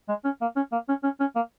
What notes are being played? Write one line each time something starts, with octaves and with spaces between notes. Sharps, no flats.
G#3
C#4
A#3
C#4
A#3
C#4
C#4
C#4
A#3